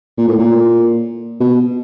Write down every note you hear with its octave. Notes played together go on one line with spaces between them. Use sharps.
A#2
A2
A#2
B2